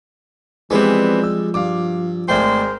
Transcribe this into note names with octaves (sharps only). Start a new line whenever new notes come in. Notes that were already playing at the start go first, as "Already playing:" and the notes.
E3 F3 G3 G#3 B3 C4
E6
G2 F5 D6
G#1 G#3 A3 A#4 C5 D5 G5